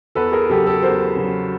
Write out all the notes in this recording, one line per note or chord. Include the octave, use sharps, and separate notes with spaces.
E2 A4 B4
G#4 A#4
C#3 F#3 G4 A4
G4 A4
E2 A#4 C5
C#3 F#3